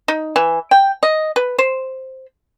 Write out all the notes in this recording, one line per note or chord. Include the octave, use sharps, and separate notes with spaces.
D#4
E3
G5
D#5
B4
C5